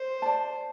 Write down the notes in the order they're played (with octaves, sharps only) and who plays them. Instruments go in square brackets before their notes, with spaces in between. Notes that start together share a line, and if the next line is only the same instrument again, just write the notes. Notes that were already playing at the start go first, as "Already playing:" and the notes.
Already playing: [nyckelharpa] C5
[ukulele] D5 A5